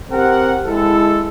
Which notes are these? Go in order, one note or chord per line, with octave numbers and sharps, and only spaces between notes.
C4 G4 A#4 F#5
G#3 E4 A4